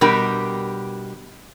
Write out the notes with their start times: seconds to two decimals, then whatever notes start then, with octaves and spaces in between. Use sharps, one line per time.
0.01 B2 G3 D4 G4 A#4